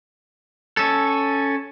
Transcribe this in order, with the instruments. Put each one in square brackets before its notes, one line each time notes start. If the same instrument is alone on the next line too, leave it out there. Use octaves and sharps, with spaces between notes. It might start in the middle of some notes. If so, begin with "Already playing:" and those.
[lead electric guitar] C#4 A4